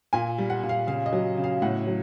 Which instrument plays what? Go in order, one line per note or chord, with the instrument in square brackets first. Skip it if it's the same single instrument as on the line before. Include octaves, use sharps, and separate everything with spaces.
[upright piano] A#2 G#5
G3
F#5
A#2
F5
C#3 F5
D#5
F#3
C#3
F5
A2 F#5
F#3